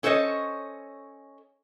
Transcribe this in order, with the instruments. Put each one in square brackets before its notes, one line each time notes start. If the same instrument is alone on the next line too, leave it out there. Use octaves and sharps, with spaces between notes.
[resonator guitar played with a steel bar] C#4 A4 C5 C#5 D#5